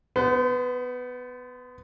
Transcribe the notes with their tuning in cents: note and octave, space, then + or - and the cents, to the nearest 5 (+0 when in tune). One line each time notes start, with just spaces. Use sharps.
B3 +10 C5 -40